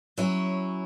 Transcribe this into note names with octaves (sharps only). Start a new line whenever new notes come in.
F#3 C#4 E4